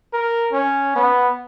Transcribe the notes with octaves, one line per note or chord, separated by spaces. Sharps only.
A#4
C#4
B3